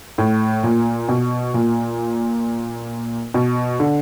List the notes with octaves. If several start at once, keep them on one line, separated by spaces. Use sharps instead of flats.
A2
A#2
B2
A#2
B2
D3